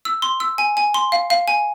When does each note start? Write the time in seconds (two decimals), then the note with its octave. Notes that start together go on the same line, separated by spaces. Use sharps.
0.05 E6
0.22 C6
0.40 E6
0.58 G#5
0.77 G#5
0.94 C6
1.12 F5
1.30 F5
1.48 G#5